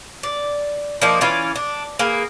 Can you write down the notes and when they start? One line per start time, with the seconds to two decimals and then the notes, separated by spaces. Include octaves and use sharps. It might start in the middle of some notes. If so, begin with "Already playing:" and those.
0.23 D5
1.01 F3 A#3 D4 D#4
1.21 E3 C#4 F4 D5
1.56 D4
1.99 A#3 G#4 B4